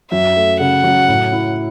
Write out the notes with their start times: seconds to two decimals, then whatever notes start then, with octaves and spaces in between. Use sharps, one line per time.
0.11 F#2 E5
0.36 A3
0.60 C#3 F#5
0.84 F#3
1.08 A2
1.32 E4